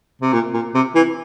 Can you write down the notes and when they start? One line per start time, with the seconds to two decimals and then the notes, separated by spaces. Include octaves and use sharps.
0.21 C3
0.33 A#2
0.54 A#2
0.74 C3
0.95 E3